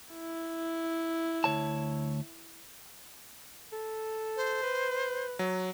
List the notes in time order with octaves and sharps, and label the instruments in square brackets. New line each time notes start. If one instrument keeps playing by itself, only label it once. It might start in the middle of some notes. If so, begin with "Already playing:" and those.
[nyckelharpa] E4
[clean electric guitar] D2 C#5 A5
[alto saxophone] A4
[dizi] C5
[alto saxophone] B4
[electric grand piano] F#3